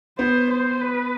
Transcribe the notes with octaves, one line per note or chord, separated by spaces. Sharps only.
B3 C5
C5
B4